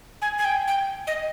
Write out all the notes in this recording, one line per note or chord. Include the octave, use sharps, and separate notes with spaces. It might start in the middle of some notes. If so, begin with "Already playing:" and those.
G#5
G#5
G5
G5
D#5